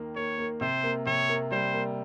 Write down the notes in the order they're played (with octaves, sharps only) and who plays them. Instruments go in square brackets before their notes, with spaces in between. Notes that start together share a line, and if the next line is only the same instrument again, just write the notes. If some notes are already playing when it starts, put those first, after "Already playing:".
Already playing: [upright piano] D#2 D#3 A#3
[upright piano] A#3 [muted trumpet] C#5
[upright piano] A#3
[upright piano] C3 [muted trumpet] C5
[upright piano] A#3
[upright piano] C3 [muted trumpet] C#5
[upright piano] A#3
[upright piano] G3 [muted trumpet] C5
[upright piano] A#3